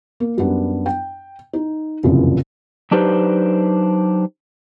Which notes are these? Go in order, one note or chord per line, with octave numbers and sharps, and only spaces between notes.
A#3
F#2 G3 B3 D4
G5
D#4
F1 C2 F#2 A#2 C#3 E3
F#3 D4 D#4 G4 B4 C5